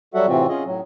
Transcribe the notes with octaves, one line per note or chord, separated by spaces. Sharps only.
F#3 G3 F#4 A4 E5 F#5
A2 C3 E3 C4 F4 F#4
C#4 F4 G#4 D#5
A2 F#3